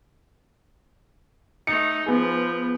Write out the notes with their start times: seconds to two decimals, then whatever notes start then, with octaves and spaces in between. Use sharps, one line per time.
1.67 A3 D#4 C#7
2.06 F3 B3 G#4